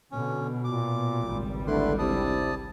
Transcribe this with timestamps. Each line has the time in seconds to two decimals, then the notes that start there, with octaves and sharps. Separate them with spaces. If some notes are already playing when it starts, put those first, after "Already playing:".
0.12 B2 D3 C#4
0.64 A#2 D6
1.22 G#1 C#2 G3
1.67 D3 A3 E4 B4 C6
1.99 C3 E4 D5 A5 D#6